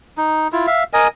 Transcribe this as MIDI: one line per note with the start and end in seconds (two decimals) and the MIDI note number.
0.18 0.48 63
0.52 0.66 64
0.52 0.66 65
0.67 0.83 76
0.67 0.83 77
0.93 1.08 70
0.93 1.08 75
0.93 1.08 80